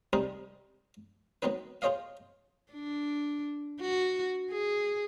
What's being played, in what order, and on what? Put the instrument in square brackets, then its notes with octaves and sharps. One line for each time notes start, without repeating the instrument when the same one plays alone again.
[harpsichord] C3 G3 C4 D#4 G#4 A#4
D#3 F#3 B3 C4 D#4 B4
F4 G#4 C5 C#5 D#5 F5
[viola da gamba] D4
F#4
G#4